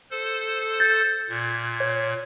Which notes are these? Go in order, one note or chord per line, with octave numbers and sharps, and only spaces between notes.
A4 C5
G6 A6
A#2 G#6
C#5